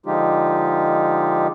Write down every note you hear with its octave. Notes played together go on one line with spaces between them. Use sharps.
D3 F3 G#3 D#4 F4 G4